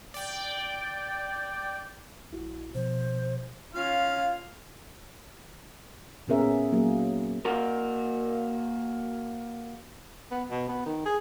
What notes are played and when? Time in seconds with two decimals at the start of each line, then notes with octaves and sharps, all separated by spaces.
0.14 D5 G5
2.31 A#1 E4 F#4
2.75 B2 F3 C5
3.75 C#4 F4 F5
6.28 A#2 B3 C#4 G#4 A#4 E5
6.41 G#4
6.72 F#3 A#3 G#4
7.45 A#3 F#4 A#4
10.31 B3
10.51 B2
10.69 B3
10.86 D#3
11.05 G#4